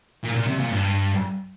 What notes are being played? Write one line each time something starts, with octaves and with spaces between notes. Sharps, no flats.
A#2
A#2
C3
A#2
G2